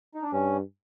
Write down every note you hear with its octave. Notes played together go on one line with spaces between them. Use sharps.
D#4
D4
G2 C#4